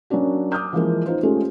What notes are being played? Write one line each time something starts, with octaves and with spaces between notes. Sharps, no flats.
F#3 A#3 C#4 D4 F#4
D6 D#6 F6 G6
E3 F3 G#3 A#3
D#4 F4 B4 C5
G#3 A3 C#4 F4 G4 A4